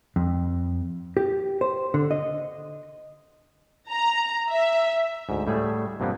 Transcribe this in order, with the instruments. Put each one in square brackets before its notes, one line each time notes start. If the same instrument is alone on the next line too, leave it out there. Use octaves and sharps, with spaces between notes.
[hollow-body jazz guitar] F2
G4
C5
D3
D#5
[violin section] A#5
E5
[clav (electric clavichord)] D2 G#2
A2 G3 A3 G#4
G2 C3 F3 A#3 B3